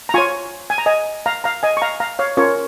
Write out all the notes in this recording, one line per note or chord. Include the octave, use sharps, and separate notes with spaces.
A#5
F4 C#5 G#5 C#6
G#5
A#5
D#5 G#5
F5 A#5
F5 A#5
D#5 G#5
C#6
F5 A#5
F5 A#5
C#5 F5
C#4 F4 A#4 C#5